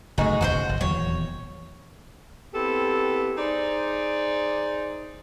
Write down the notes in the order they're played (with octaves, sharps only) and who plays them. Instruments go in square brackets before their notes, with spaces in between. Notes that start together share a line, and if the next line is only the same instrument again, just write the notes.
[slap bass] F#1 G#2 A3 [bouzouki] G#3 D#4 F#4
[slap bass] D#1 G#1 C#2 [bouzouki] F#4 A4 C5
[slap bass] G1
[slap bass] D#1 E2 F#3 [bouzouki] C#5
[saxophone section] B3 C4 E4 G4 A4
D#4 G#4 C5 D5